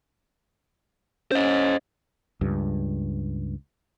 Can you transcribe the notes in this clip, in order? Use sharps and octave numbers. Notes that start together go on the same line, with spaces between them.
C#4 C5 D#5
C#2 G2